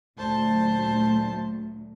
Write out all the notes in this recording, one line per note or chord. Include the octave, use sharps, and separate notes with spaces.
D2 A#2 F#3 C5 A5